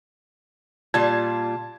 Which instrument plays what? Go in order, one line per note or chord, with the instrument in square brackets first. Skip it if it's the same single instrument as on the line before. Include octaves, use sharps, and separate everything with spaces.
[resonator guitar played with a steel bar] A#2 G3 F4 [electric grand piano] A5 G#6